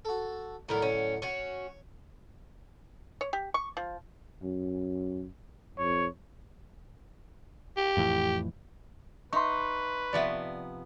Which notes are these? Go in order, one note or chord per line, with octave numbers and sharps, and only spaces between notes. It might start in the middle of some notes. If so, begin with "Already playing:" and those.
F#4 A4
A2 D3 D#3 F#3 E4 A#4
C#4
C#4 F#4 C#5
C#5
G4
C#6
F3
F#2
F2 C#5
G4
F2 A2 E3
D#4 B4 E5 C6 C#6
C3 F3 B3 D5 E5